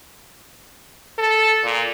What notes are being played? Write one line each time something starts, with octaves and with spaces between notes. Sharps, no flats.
A4
A#2